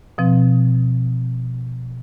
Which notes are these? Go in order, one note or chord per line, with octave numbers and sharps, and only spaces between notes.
B2 F3 C4